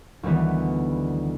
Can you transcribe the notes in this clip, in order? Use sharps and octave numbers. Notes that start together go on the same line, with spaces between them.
D2 D#3 E3 G3 B3